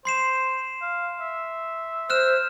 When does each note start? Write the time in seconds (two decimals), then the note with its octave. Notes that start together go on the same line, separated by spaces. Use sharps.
0.05 C5 C6 C7 E7
0.82 F5
1.20 E5
2.10 C5 F6 F#6 E7